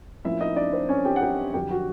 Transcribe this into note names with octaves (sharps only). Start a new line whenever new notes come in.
A2 F3 A#3 C#4 E4 E5
D#4 D#5
D4 D5
C4 C5
C#4 C#5
G4 G5
F#5
G4 G5
F2 D3 F#3 G4 G5
F#4 F#5